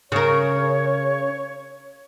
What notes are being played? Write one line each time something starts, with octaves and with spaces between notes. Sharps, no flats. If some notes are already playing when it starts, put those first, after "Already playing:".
C#3 A#4 C#5